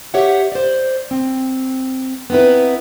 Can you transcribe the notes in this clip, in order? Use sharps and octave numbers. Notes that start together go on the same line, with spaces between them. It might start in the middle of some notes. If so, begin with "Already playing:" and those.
G4 C#5 E5 F#5
C5 D5
C4
B3 C4 D#4 E4 B4